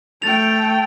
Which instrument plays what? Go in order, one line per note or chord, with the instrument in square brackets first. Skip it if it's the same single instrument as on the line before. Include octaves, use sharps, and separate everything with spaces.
[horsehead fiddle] A3 G5 [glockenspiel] A6 F7